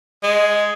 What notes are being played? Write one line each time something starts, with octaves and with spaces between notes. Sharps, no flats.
G#3